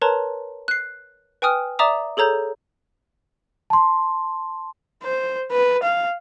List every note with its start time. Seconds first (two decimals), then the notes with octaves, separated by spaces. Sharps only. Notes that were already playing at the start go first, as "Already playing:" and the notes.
0.02 A#4 B4 C#5 A5 A#5 C6
0.68 F#6 C7
1.42 B4 G5 G#5 D#6 F6
1.79 D5 E5 A#5 D6 D#6 E7
2.17 G#4 A4 C#5 A#5 G6
3.70 A5 C6
5.03 C5
5.51 B4
5.83 F5